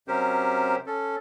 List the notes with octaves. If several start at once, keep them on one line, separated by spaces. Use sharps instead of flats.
C3 F#3 C#4 G4 A#4 C5
C#4 A4